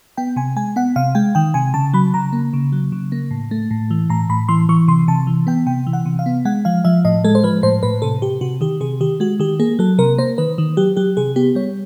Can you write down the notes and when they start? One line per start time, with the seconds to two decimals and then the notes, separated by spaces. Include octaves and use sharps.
0.17 B3 G5
0.36 C3 G#5
0.56 G#3 G#5
0.76 B3 F#5
0.96 C3 F5
1.15 G#3 G5
1.35 D#3 G5
1.54 C3 G#5
1.74 C#3 A5
1.94 F#3 B5
2.14 C#3 A#5
2.33 A#3
2.53 C#3
2.72 F#3
2.92 C#3
3.12 A#3
3.31 A2
3.51 A3
3.71 A2
3.91 E3
4.10 A2 A#5
4.30 A2 B5
4.48 E3 C6
4.69 E3 C#6
4.88 C3 C6
5.08 C3 A5
5.27 E3
5.47 B3 G5
5.66 C3 G5
5.87 E3
5.93 F#5
6.06 C3
6.19 F5
6.26 B3
6.45 G#3 F#5
6.65 F3 F5
6.85 F3 E5
7.05 A2 D#5
7.24 G#3 A4
7.35 C5
7.44 F3 B4
7.63 A2 C5
7.83 A2 B4
8.02 C3 A4
8.22 C3 G4
8.41 C3 F#4
8.61 D#3 G4
8.81 C3 G#4
9.00 D#3 G4
9.20 G#3 F#4
9.39 D#3 G4
9.60 A#3 G#4
9.79 F#3 A4
9.98 C3 A#4
10.18 A#3 C5
10.38 D#3 B4
10.58 D#3
10.77 F#3 G4
10.97 F#3 G4
11.17 C3 G#4
11.36 B3 G4
11.55 G3 C#5